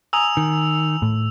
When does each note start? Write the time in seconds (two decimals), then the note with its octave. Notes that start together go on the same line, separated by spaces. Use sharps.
0.13 G#5 A#5 D#6 E6 F7
0.37 D#3
1.02 A2